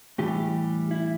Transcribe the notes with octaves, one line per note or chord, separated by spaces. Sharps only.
A2 E3 G3 G4
E4